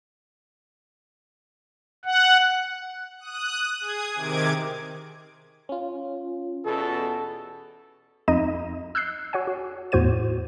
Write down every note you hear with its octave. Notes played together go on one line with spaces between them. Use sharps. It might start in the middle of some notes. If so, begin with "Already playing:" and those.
F#5
D#6 F#6
G#4 D#6 G#6
C3 D#3 D6 G#6 D7
C#4 F4
E2 B2 A4
F2 D#4 D#5 D#7
E6 F#6 G6 C7
F#4 C#5 F#5 G#5
F#4
E2 A2 F#4 C5 G#6 D#7